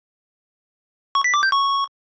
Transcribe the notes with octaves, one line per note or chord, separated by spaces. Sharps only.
C#6
B6
D6
G6
C#6